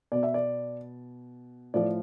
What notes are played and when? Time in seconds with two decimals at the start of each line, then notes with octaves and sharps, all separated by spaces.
0.12 B2 D5
0.23 E5
0.34 D5
1.74 A2 F3 D5